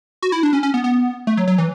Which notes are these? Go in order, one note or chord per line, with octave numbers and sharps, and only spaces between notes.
F#4
E4
D4
C#4
C#4
B3
B3
A3
F#3
F#3
E3